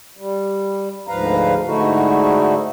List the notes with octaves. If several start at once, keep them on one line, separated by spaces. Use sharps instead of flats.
G3
D2 G#2 F3 B4 F5 A#5
G#2 D3 A3 D#4 E4 F#4